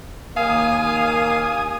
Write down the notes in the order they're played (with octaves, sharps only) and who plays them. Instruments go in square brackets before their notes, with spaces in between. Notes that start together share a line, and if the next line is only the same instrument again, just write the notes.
[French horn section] D#2 A#3 [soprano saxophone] F5 [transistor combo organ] G#5 D#6